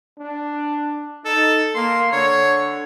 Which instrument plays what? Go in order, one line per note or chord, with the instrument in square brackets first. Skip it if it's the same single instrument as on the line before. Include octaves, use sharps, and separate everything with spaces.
[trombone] D4
[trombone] D#4 [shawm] A4
[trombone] A#3 [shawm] C6
[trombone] D3 [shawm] C#5